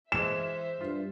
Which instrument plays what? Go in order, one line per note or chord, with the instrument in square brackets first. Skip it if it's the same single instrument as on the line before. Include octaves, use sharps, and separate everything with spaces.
[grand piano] E3 G#3 [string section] C5 E5 [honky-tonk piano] E7
[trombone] G2 [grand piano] F4